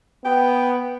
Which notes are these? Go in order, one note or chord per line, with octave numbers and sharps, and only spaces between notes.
B3 G5